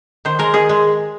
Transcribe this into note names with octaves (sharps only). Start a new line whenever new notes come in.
D#3 C5
G#3 A#4
D#3 G#4
G#3